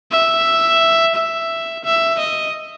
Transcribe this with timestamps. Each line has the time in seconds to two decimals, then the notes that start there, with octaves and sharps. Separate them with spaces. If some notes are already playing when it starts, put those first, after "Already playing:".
0.12 E5
1.15 E5
1.84 E5
2.19 D#5